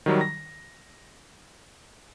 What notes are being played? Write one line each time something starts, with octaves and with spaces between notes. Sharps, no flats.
D#3 F#3 G3
A#6